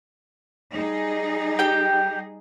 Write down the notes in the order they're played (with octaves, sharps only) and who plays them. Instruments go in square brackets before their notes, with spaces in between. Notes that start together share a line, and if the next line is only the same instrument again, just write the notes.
[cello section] G3 D#4 G#4
[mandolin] G4 G5